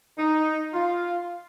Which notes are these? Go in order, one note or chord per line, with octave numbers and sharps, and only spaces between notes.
D#4
F4